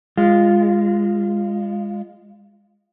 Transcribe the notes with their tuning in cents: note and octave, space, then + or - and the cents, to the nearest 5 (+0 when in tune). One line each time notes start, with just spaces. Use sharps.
G#3 -25 F4 -10